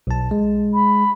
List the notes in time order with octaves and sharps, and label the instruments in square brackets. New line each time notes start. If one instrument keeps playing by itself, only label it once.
[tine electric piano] B1 A5
G#3
[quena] B5